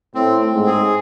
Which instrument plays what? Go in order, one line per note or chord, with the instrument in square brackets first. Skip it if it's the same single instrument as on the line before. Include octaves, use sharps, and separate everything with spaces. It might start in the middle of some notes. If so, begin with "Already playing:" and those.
[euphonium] A2 [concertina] C4
[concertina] C4
[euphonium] G#2
[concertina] G#4